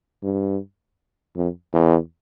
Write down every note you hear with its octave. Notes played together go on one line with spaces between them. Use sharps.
G2
F2
E2